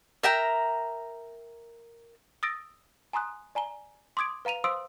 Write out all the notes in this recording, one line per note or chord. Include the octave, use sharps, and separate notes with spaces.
A#4 E5 G5 A#5
D#6 E6 A6 A#6 D7
G#5 A#5 C6 D#6 F#6
D5 G#5 A#5 G7
C6 D6 D#6 G#6 D7
B4 F5 A#5 D#7 F7
C5 F5 C6 D#6 E6 D7